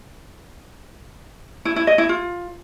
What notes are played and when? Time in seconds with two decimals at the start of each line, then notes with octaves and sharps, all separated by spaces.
1.65 E4
1.76 E4
1.87 D#5
1.98 E4
2.09 F4